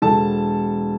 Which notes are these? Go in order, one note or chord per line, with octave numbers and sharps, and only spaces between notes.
E1 A4 A5